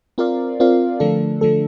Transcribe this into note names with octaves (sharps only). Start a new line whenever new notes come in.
C4 F4 A#4 D5 F5
C4 F4 A#4 D5 F5
D3 F3 A3 D4 A4
D3 F3 A3 D4 A4